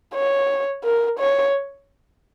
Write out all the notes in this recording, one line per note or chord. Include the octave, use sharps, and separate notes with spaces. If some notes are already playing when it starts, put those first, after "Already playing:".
C#5
A#4
C#5